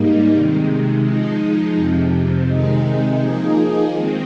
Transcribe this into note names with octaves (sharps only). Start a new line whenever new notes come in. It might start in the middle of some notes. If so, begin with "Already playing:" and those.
Already playing: G#2 G3 A#3 D#4
C3 D#3 G#3
F3 G#3 D#4
F2 C3 F3
C3 D#3 G#3 D#4
F3 A#3 D#4 G#4
D#3 G#3 C4